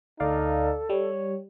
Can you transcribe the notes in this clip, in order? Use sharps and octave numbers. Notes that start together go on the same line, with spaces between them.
D2 D#4 A4 D5 F5
G3 C#5